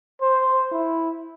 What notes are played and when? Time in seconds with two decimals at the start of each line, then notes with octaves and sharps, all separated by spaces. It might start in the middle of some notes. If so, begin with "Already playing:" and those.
0.22 C5
0.72 E4